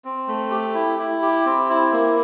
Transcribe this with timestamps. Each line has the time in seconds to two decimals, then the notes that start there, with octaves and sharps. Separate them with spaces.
0.05 C4
0.28 A3
0.51 G4
0.74 E4
0.99 E4
1.22 G4
1.46 C4
1.69 E4
1.92 A#3